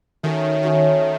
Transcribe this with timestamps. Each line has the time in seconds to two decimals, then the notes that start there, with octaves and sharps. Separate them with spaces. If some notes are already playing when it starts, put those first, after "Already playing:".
0.23 D#3 A3 C#4 F#4 C#5
0.63 D#3 A3 C#4 F#4 C#5
1.01 A3